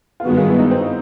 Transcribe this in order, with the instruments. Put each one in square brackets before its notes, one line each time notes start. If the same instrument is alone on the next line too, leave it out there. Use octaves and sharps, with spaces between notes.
[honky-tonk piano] F4
[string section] G#1 G2 D#3 G#3 B3 [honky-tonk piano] F#4
[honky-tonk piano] F4
E4
D#4
C4